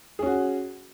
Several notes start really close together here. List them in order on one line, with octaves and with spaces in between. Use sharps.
G#4 C#4 F#4